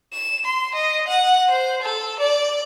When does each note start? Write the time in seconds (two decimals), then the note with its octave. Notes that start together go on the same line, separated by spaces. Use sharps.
0.13 E7
0.45 C6
0.75 D#5
1.08 F#5
1.49 C5
1.82 A4
2.19 D5